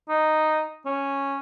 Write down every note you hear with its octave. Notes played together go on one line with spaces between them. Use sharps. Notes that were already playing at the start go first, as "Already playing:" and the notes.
D#4
C#4